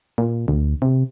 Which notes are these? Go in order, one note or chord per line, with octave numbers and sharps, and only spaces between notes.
A#2
D2
C3